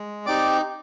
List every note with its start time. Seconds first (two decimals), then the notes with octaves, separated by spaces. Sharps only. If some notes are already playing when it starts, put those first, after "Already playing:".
Already playing: G#3
0.26 C4 D#4 G4 D5 D6